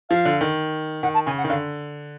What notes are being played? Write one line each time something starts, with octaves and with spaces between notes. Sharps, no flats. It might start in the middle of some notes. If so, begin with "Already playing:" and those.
F3 F5
D3
D#3
D#3 F#5
A5
C#3 G#5
F#5
D#3
D3 F5